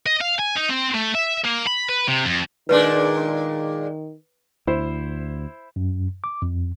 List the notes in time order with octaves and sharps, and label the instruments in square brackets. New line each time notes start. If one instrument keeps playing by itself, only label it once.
[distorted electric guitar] D#5
F5
G#5
D#4
C4
A3
E5
A#3
B5
B4
C3
F2
[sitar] A#2 G#3 D4 [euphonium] D#3 [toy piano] B4
[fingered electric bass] D2 [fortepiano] E4 C5
[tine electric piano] F#2
D6
F2